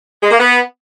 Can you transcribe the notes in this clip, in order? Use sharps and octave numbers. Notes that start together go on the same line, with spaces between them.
G#3
A#3
B3